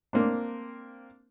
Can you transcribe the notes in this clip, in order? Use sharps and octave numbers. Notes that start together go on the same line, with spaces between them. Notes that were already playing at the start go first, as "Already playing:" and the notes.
A#3 C4 D4